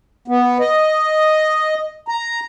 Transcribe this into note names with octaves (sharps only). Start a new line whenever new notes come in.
B3
D#5
A#5